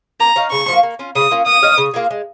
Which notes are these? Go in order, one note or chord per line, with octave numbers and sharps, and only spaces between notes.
A#3 A#5
D#4 C#5 F5
C#3 C#6
F3 A#3
A#3
C#4 F4
C#3 D#6
A#3 C#4 F4
A#3 D#6
D#4 C#5 F5
C#3
A#3 F4 G#4
G#3